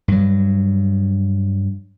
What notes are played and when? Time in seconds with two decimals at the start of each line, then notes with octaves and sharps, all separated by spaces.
0.08 G2 F#3